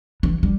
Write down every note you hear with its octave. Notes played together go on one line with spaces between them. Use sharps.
E3
G3